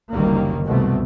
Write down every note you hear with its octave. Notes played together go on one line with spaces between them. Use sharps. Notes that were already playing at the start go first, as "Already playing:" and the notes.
F#1 D2 D#3 G3 A#3
C2 B2 A3